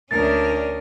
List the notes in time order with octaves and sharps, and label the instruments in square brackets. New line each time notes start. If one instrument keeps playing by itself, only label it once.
[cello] D2 A#4 [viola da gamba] C#4 D4 [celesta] A6